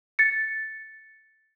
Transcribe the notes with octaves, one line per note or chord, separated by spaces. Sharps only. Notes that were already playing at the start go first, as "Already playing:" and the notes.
A6 C#7